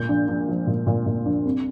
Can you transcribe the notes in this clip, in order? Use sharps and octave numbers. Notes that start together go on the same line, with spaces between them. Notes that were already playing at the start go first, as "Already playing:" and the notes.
Already playing: A#2 G6
A#1
A#1
F3
A#2
A#2
A#2
A#1
C2